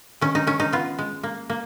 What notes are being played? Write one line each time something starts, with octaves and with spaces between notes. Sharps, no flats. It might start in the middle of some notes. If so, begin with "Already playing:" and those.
D#3 C#4
D#4
D#3 C#4
D#4
B3 F4
G#3
A#3
A#3